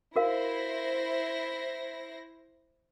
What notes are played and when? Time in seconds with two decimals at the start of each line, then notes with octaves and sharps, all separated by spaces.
0.16 E4 F#4 A#4 C5 F5 A#6